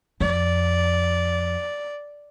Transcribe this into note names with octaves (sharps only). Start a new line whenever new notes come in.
F2 D5